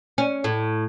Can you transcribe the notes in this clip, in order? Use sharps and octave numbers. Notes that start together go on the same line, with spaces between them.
C#4
A2